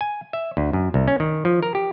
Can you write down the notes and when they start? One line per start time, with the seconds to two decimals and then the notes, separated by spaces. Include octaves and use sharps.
0.01 G#5
0.33 E5
0.57 D2
0.73 F#2
0.94 C2
1.08 C#4
1.20 D#3
1.45 F3
1.63 A#4
1.75 G4